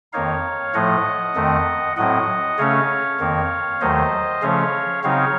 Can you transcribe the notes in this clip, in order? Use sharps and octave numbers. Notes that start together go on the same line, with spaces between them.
F2 D#3 A#3 D#4 C#5 F5
A2 F3 A3 D#5 F#5
F2 D#3 A3 C4
A2 F#3 C4 D#5 F#5
C#3 A3 C#4 C#5 F5
F2 D#3 A#3
D#2 D#3 F#3 A3 C5 D#5
C#3 F3 A3 C#4 C#5 F5
C#3 F#3 C4 D#4 C#5 F5